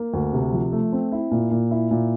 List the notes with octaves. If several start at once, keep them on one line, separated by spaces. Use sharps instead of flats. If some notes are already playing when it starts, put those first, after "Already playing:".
Already playing: A#3
D2
C3
F3
A3
C4
E4
A#2
A#2
E4
A#2